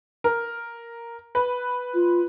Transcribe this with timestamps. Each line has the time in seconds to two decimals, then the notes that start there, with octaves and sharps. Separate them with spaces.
0.24 A#4
1.35 B4
1.94 F4